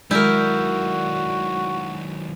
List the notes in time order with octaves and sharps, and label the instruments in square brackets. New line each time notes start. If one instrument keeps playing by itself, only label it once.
[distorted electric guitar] D#3 F#3 [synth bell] G#3 D5 G6 [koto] E4 A#4 [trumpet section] F#4